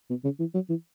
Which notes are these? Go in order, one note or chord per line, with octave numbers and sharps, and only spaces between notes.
B2
C#3
E3
F#3
E3